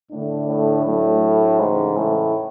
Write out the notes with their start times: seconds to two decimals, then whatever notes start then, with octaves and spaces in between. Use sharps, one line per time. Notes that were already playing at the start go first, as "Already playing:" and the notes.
0.11 A2 D3 A3 D4
0.48 A2
0.86 A2 F#3 A3 D4
1.59 G#2 C#3 E3 A3
1.97 A2